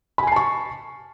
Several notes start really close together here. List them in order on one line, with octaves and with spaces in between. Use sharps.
B5 G#5 C7 A5 C#6